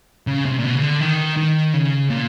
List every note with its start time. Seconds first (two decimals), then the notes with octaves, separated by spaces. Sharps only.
0.27 C#3
0.46 C3
0.58 A#2
0.64 B2
0.75 C#3
0.82 D3
1.01 D#3
1.37 D#3
1.73 C#3
2.10 A#2